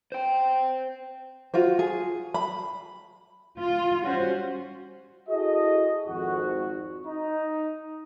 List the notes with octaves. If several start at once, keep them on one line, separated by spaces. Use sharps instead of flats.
C5 G5
F4 F#4 C5
G#4
B5
F4
G3 C#4 F#4 C5
E4 F#4 G#4 A4 D#5
G#1 F2 F#4
D#4